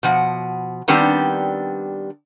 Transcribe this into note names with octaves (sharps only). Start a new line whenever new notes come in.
B2 F3 F#5
D#3 G3 B3 C4 D4 G4